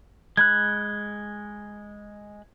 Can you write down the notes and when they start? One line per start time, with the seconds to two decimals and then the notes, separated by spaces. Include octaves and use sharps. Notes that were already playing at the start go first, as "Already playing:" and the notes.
0.37 G#3 B5 F#6 G#6